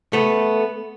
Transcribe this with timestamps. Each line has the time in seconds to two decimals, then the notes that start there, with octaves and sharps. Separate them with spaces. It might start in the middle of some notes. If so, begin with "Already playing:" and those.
0.13 A3 B3